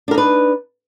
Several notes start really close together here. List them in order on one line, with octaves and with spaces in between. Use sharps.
D4 A#4 D#4 B4